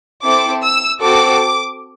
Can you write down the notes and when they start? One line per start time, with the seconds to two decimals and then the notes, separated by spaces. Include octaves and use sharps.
0.23 C4 E4 A4 D6
0.62 E6
1.01 C4 F#4 A4 D6